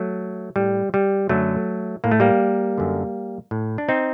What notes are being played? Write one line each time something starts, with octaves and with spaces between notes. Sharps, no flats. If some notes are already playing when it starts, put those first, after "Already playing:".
Already playing: F#3 A3
A2 G3
G3
F#2 D3 F#3 A3
A2 A#3
A3
G3 A#3
F#2 D3
A2
D4
C4 D#4